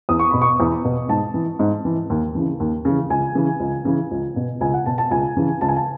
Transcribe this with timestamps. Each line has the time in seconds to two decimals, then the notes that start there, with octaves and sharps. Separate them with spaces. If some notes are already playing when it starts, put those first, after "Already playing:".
0.09 E2 D#6
0.19 C#6
0.31 B2 B5
0.42 C#6
0.60 E2
0.85 B2
1.09 G#2 A5
1.34 E3
1.59 G#2
1.85 E3
2.10 D#2
2.35 C#3 E3
2.60 D#2
2.85 C#3 E3
3.10 C#2 G#5
3.35 C#3 E3
3.60 C#2
3.85 C#3 E3
4.11 C#2
4.36 B2
4.61 C#2 G#5
4.74 F#5
4.86 B2 A5
4.98 A5
5.11 C#2 G#5
5.36 C#3 E3
5.61 C#2 A5
5.69 G#5
5.77 A5